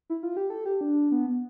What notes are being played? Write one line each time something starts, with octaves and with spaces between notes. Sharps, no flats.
E4
F4
G4
A4
G4
D4
B3